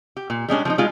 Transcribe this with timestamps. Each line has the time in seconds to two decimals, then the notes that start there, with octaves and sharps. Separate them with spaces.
0.17 G4
0.30 A#2
0.49 G3 G#3 C#4 D4
0.65 F3 G#3 D#4
0.78 G3 G#3 D#4 F4